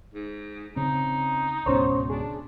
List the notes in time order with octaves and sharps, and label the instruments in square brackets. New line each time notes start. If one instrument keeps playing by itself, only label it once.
[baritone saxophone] G#2
[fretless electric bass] C#3 C4 [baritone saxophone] D#4
[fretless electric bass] C#2 G#2 B2 [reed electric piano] C#4 C5 C#5
[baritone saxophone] D4 [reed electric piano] G#4